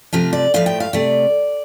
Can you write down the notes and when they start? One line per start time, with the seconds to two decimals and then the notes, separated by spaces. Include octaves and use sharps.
0.13 C3 F3 A3 F5
0.33 D5
0.54 A2 F3 A3 F5
0.66 G5
0.80 F5
0.93 C3 A3 D5